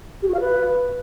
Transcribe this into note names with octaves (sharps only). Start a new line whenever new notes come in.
G4
F#4
F5
B4